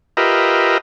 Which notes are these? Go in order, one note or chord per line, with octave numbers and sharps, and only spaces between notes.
F4 G4 A#4 B4 D#5 E5